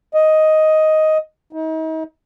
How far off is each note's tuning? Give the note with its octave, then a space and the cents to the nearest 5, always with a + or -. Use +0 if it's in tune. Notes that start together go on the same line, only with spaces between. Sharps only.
D#5 +5
D#4 +40